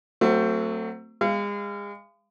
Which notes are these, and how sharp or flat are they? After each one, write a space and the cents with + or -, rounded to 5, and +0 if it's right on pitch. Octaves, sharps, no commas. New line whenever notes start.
F#3 +5 A3 +30 C4 +0
G#3 -35 F5 -30